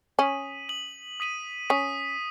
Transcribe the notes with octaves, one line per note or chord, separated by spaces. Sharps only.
C#4 D#6 B6 D#7 F#7
D#6 B6 D#7 F#7
D#6 B6 D#7 F#7
C#4 D#6 B6 D#7 F#7